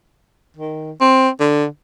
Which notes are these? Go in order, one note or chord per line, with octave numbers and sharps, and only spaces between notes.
D#3
C4
D3